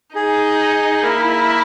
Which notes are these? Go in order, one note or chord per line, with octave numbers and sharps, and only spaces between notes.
D#4 G#4
A#3 E4 A#4